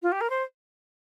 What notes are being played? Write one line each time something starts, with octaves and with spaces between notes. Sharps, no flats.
F4
G4
A#4
C5